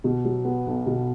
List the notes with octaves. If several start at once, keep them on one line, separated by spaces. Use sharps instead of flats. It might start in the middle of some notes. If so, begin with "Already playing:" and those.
B2
F#3
B3
B1
B2